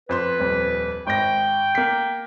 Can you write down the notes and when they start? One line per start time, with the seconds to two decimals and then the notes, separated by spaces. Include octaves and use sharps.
0.09 F2 B4 C5 C6
0.40 D#1 F2
1.07 G#1 C5 G5 A#6
1.75 A#3 B6